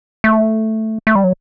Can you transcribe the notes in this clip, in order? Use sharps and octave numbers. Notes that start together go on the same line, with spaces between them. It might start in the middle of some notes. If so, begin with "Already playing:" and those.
A3
A3
G3
F#3